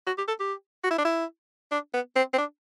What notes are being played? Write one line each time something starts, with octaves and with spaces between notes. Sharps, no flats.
F#4
G4
A4
G4
F#4
E4
D4
E4
D4
B3
C4
C4
D4